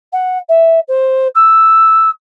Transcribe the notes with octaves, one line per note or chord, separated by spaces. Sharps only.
F#5
E5
C5
E6